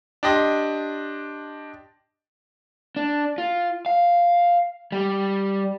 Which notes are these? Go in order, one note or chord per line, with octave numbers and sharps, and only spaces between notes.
D4 G4 D#5 C6
D4
F4
F5
G3